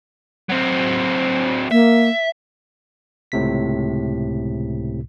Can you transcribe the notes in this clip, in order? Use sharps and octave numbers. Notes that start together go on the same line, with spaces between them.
F#3 C4
A#3 E5
C#2 A2 C3 B6